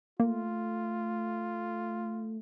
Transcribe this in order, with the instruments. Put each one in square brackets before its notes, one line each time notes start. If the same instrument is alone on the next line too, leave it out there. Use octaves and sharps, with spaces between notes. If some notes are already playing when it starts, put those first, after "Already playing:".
[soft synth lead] A3 [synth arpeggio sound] A#3 [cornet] F4